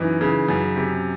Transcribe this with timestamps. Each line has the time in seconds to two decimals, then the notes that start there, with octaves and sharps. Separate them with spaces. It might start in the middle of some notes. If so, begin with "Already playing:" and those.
Already playing: F#2 E3 D#4
0.21 C#3
0.48 F#2
0.76 C3